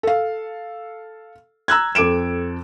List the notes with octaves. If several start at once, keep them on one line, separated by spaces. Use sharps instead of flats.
A4 F5
A#5 E6 F#6 G#6
F2 A4 D6 D7 E7